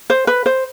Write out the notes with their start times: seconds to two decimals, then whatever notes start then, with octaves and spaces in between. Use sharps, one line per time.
0.10 C5
0.27 B4
0.46 C5